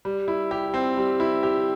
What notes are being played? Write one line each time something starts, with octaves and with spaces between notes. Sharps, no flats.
G3
E4
G4
C4
G3
E4
G4